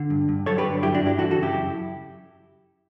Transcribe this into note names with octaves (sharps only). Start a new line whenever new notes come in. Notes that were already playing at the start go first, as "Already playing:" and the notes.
Already playing: D3
G2
G2
F#3 A4 C#5
G4 B4
D3
G2 E4 G4
D4 F#4
G2
E4 G4
E3 F#4 A4
F#4 A4
C#3
E4 G4
F#2